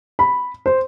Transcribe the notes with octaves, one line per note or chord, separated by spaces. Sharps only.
B5
C5